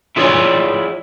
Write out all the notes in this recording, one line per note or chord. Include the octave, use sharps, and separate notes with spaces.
E4 F4 G#4 C#5 D5